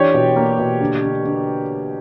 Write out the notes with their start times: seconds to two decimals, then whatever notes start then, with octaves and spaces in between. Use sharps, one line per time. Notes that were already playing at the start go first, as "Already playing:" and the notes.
Already playing: E3 D4 F4 G4 C#5 D5
0.14 B2
0.36 A#3
0.58 B2
0.81 D3
1.03 D3
1.25 D3